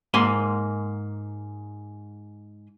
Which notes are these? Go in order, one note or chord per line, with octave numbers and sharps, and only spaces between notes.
G#2 A#3 G#5 B5 C6